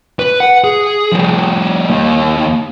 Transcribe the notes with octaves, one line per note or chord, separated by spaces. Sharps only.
B4
F#5
G#4
F3 G3
D#2 A#3